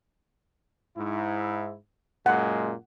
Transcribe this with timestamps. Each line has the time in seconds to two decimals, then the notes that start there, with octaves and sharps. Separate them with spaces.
0.96 G#2 E4
2.26 F#2 A#2 G#3 F#5